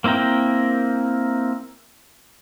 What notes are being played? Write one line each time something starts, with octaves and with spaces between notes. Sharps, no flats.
A#3 C4 E4 A#4 G5